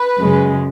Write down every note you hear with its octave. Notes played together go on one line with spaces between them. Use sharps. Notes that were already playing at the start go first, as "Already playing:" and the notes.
Already playing: B4
F#2 C#3 G#3